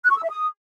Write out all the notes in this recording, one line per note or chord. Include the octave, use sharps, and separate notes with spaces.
F#6
C#6
E6
E5
D#6